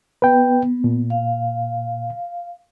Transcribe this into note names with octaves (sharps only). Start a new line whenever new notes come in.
B3 B4 G5
A#2
F5